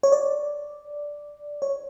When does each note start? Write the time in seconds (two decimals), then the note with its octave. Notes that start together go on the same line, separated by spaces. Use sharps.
0.03 C#5
0.12 D5
1.62 C#5